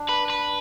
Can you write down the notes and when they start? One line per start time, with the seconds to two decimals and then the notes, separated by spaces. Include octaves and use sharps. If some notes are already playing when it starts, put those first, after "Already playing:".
Already playing: D4
0.09 B4
0.30 B4